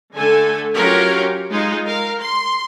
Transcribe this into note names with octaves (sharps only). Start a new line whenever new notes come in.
D3 A3 A4 G#5
F#3 C#4 F4 G4 A#4 C#5
G#3 D#4 F4
A#4 F5
C6